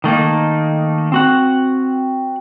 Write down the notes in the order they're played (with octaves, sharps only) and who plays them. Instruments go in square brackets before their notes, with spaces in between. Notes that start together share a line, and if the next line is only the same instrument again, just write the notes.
[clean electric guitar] D#3 A3 A#3 D#4
C4 F#4 F#5